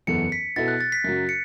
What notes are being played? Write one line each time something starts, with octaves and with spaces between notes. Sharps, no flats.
F#1 E2 E3 B3 A4 C#7
B6
B2 B3 E4 A4 A6
F#6
A6
B6
F#2 C#3 F#3
C#7